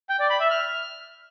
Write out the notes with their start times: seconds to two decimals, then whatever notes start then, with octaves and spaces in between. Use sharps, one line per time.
0.09 G5
0.20 D5
0.30 B5
0.40 E5
0.50 F6